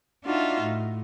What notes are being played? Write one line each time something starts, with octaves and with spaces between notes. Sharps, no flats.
D4 D#4 F4 F#4 E5
A2